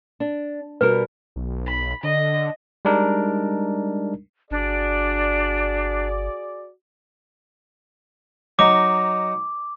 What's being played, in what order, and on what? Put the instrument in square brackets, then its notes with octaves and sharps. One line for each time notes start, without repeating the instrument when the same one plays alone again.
[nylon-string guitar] D4
[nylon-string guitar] B2 G3 A#4 [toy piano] B4
[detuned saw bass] B1
[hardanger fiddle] B5
[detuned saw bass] D3 [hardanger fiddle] D#5
[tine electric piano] G3 G#3 D4 D#4 A#4
[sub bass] G1 [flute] D4 [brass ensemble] F#4 G#4 D5
[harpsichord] F#3 D#4 [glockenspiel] D6